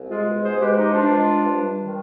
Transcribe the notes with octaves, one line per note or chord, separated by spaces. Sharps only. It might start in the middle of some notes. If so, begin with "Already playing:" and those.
Already playing: C2
G#3 F4 G#4
B2
G#2 G#4 C5
G#3 G4 B4
F3 D#4 G4
G2 D4 F4
G#3
F3
G2
G3
D#3